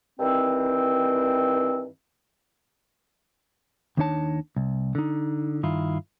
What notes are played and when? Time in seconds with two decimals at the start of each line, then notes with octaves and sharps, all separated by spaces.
0.20 G2 D#3 E3 C4
3.97 D#2 D#3 D4 D#4 C#5 A5
4.56 C2
4.95 D3 D#4
5.63 G2 D#3 E4 F4